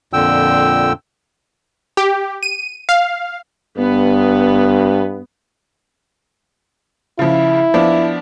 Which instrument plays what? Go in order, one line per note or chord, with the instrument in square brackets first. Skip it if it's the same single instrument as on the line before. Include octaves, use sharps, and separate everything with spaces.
[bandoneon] F2 A#2 D3 G5 E6
[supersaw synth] G4
D#7
F5
[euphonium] G2 [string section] B3
[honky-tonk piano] C#3 F3 [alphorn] E4
[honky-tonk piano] F3 B3 D4